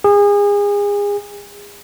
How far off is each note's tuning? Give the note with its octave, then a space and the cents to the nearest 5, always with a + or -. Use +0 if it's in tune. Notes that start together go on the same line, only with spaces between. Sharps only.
G#4 -30